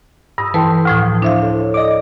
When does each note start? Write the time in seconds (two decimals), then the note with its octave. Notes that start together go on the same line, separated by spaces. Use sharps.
0.38 G2 D#6 E6
0.54 E3 A4 B4 G5 A5 C6
0.85 D2 A2 F3 G5 D#6
1.22 D4 E4 C5 E5 F5
1.43 A4 C#5
1.74 D5 D#5 D6